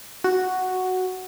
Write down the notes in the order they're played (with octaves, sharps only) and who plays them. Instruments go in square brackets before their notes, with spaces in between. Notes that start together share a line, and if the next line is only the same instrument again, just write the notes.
[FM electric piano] F#4